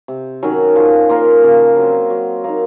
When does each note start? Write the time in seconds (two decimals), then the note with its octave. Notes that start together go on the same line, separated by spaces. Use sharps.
0.08 C3
0.43 D#3 F#3 C#4
0.76 F3
1.09 A#3 F4 A#4
1.43 C#3
1.77 F#3 C4
2.10 F#3
2.44 A#3 D#4